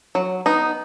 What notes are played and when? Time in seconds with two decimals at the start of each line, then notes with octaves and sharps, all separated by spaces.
0.15 F#3
0.46 B3 D#4